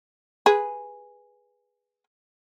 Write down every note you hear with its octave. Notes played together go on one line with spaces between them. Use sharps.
G#4 B4